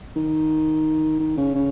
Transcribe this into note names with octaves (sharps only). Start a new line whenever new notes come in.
D#3
D#3
C#3
C#3